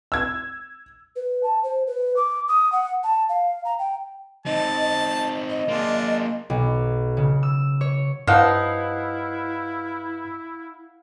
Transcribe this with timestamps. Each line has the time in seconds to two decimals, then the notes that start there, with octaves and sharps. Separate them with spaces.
0.12 E6 G#6
1.16 B4
1.43 A5
1.63 C5
1.87 B4
2.16 D6
2.48 D#6
2.72 F#5
3.04 A5
3.29 F5
3.65 A#5
3.79 G5
4.46 C4 D#4 D#5 A5
5.49 D#5
5.68 A#3 D4 F4 G#4
6.50 B1
7.17 C#3
7.43 E6
7.81 C#5
8.27 G2 F3 D#4 E4 F5 F#5